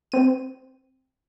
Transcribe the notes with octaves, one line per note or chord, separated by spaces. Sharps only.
C4 D#7